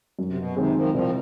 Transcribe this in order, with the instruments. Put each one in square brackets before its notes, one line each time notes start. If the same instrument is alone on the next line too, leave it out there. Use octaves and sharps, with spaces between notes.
[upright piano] F#2
[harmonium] C3
B2
[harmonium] C3 [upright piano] D#3 G#3 C4
[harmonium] D#3 F3
[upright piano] C2 [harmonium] D#3 F3